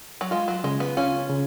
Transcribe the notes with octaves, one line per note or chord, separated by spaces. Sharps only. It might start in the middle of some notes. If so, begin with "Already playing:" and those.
F#3
G#3 F4
F#3
C#3 G#3
B3
C#4 F4
C#3